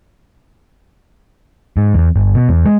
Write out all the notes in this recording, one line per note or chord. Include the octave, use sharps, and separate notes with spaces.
G#2
E2
G1
B2
E2
G#3